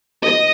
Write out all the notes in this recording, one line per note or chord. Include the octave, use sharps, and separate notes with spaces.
D#5